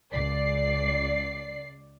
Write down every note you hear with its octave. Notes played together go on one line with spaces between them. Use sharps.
C#2 D5 C7